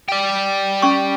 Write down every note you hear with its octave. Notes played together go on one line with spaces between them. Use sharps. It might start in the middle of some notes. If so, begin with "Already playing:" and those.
G4 D5
C#4 C#6